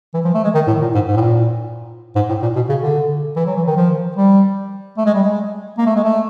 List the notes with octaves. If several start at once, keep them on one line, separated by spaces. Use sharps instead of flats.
E3
F3
A3
G#3
D#3
A2
A#2
G#2
G#2
A2
A#2
G#2
A2
A#2
B2
C#3
D3
E3
F#3
E3
D#3
F3
G3
A3
G#3
G3
G#3
A#3
A3
G#3
A3